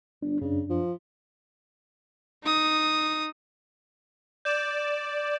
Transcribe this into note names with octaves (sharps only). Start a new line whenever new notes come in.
G1 D4
F#2 C#3 D4
F3
D#4 D#6
D5 G6 E7